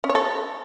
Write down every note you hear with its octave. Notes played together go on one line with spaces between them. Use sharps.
C#4
C#5
A4